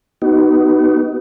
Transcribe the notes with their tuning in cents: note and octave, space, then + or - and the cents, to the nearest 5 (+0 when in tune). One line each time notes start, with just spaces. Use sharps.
B3 +0 D#4 +0 F#4 +40